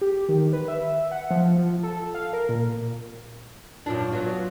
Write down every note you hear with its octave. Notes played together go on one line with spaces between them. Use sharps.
G4
D#3
B4
E5
F#5
F3
F3
A4
F5
A#4
A#2
F#2 A#2 D4 F4
F#3 B3